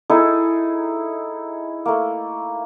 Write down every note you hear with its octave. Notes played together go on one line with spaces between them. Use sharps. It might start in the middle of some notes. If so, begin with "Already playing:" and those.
D#4 E4 G#4 A4
A3 A#3